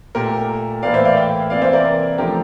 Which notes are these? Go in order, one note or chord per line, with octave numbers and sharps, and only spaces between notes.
A#2 A3 G4 A#4
A2 E3 A#3 D5 F5
C5 E5
D5 F5
E5 G5
C3 E3 A#3 D5 F5
C5 E5
A#4 D5
D3 F3 A3 G4 A#4